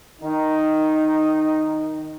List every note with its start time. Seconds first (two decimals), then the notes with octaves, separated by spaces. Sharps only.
0.22 D#3 D#4